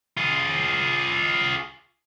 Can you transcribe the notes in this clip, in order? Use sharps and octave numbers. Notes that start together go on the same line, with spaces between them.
F4 G#4